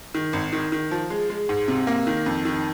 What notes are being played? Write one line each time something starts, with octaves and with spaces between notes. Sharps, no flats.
D#3
G#1
D#3
D#3
F3
G#3
G#3
G#2
C3
A#3
D#3
F2
D#3